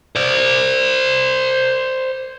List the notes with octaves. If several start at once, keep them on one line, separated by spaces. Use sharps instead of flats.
C5 D5